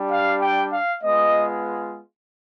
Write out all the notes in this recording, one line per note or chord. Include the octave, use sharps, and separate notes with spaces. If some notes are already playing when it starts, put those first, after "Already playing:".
Already playing: G3 D4 G4
F5
G5
F5
G#3 B3 F4 D#5